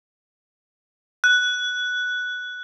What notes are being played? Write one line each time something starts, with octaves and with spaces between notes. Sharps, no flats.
F#6